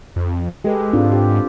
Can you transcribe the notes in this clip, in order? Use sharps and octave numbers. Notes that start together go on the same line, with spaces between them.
F2
G#3 G4 A4 B4
G#2 C4 D4 F4
G4